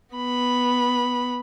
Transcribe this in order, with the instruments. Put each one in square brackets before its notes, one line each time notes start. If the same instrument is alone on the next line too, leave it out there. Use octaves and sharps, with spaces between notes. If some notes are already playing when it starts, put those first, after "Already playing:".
[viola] B3 B5